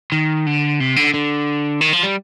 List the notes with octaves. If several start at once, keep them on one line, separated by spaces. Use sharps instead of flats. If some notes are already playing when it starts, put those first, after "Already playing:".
D#3
D3
C3
D3
D3
D#3
F3
G3